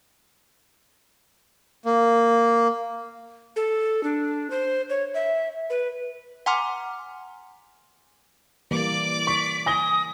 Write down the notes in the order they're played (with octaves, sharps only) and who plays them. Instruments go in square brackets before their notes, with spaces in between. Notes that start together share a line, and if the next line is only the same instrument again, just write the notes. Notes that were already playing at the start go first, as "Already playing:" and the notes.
[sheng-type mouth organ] A#3
[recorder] A4
D4
C5
C#5
E5
B4
[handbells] F#5 G#5 A#5 C6 D6 F6
[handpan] E3 G3 A#3 [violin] D5 D6
[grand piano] C#6 [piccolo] B6
[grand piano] G#5 A#6 G7 [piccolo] D#6